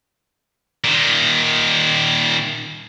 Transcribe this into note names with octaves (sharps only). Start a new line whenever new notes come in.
A#2 D#3